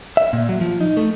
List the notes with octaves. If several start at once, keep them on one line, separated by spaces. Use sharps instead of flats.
E5
A#2
F#3
F3
D#4
A3